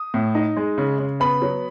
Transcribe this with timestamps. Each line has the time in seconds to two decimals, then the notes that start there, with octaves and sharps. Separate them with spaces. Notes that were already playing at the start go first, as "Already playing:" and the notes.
Already playing: D#6
0.14 A2
0.35 D#4
0.57 G#3
0.78 C#3
0.99 C#3
1.20 B3 B5
1.42 F#3